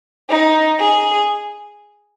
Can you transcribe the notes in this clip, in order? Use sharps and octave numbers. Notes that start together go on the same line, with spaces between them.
D#4
G#4